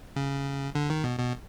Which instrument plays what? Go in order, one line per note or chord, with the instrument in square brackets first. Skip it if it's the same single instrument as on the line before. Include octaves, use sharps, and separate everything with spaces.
[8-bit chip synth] C#3
D3
D#3
B2
B2